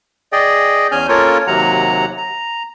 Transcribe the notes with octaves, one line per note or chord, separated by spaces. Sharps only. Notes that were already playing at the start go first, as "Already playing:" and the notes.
G#4 D5 D#5 G5
E2 C#4 G#5 F6 G6
A#3 C#4 F4 A4 A#4 C#5
D#2 C3 F#3 F#5 A#5
A#5